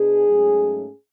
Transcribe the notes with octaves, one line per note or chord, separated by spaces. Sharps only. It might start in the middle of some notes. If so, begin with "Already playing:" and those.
Already playing: B2 D4 G#4
G#2 F#3 A3 C#4